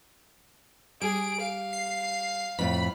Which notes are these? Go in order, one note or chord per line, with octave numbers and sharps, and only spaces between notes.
G3 G#4 D7
F5
C7
F2 A2 B5